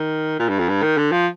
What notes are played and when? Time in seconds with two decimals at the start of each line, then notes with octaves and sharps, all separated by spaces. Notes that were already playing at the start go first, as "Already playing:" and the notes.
Already playing: D#3
0.40 A#2
0.49 G2
0.59 F2
0.69 G2
0.83 D#3
0.97 D3
1.12 F3